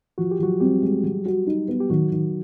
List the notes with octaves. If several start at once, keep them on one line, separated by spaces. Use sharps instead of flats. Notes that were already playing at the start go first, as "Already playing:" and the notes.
F3 F#4
G4
F3 F#3 F#4
G3 C4 G4
G#3
F#3
F#4
D#4
B3
G4
D#3 F#3 F#4
D#3